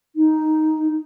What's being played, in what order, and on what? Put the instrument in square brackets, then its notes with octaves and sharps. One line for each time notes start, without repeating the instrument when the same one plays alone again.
[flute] D#4